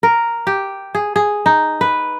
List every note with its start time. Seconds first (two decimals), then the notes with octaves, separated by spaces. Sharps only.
0.03 A#4
0.47 G4
0.95 G#4
1.16 G#4
1.46 D#4
1.81 B4